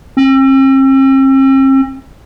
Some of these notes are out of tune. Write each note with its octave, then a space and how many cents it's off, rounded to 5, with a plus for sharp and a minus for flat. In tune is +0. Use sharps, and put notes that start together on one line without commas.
C4 +45